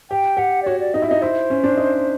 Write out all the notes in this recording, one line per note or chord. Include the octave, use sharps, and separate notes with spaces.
G4 G5
G4 F#5
D5
F#4 C#5
D5
D#4 D#5
E4
D#4 D#5
E4 C5
C#4
D4
D#4